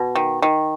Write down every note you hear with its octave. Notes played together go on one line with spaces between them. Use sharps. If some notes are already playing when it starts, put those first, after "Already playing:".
Already playing: B2
D#3
D#3